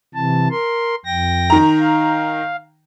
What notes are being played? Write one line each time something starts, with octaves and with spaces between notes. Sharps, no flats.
C3 E3 A5
A#4 C6
F2 G5 A#6
D#3 A#5
F5